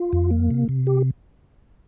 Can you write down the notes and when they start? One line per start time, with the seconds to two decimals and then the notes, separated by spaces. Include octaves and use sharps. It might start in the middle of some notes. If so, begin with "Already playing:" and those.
Already playing: F4
0.13 F2
0.31 A#3
0.51 C3
0.69 C3
0.87 G4